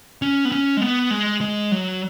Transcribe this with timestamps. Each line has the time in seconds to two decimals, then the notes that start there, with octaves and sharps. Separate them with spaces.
0.22 C#4
0.45 B3
0.52 C#4
0.77 G#3
0.81 B3
1.11 G#3
1.41 G#3
1.72 F#3